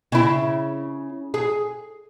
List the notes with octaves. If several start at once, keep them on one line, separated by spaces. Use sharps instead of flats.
C#3 E4
G#4